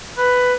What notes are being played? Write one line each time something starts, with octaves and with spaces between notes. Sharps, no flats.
B4